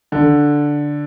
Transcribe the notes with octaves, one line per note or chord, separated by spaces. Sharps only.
D3